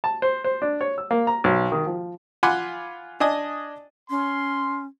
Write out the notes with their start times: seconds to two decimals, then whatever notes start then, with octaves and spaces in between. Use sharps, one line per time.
0.04 A5
0.22 C5
0.44 C5
0.62 D4
0.81 C#5
0.98 E6
1.11 A#3
1.27 A#5
1.44 B1
1.72 D#3
1.86 F3
2.43 F4 F#5 G#5 B5 C6 D6
3.20 D4 D#5 G#5 D#6
4.10 C#4 C6